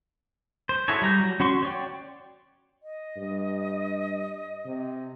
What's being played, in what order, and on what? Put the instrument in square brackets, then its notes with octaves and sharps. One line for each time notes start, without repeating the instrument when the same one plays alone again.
[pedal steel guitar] C5
E4 F#4 G#4 A4 C#5
G3 A#5 G6
F#3
C#4 F#4 C6 C#6
C#5 D5 G5
[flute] D#5
[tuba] G2
C3